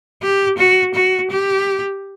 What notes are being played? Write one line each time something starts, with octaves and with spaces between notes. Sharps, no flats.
G4
F#4
F#4
G4